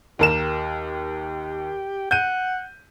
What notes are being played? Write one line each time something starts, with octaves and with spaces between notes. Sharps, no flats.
D#2 G4 A#4 E7
F#5 G6 D#7